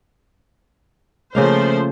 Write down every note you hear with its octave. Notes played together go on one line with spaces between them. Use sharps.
C#3 F3 A3 A#3 C5 F5